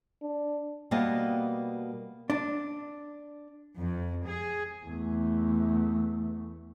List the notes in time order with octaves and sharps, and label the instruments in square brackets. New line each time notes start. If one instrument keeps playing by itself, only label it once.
[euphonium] D4
[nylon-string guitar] B2 G3 A#3 B3 D#5 A5
[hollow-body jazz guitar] D4
[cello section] F2
G#4
[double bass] E2 A3